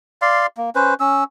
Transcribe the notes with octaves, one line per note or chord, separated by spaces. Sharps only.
D5 F5 C6
A#3
C#4 B4 C5
C#4 E6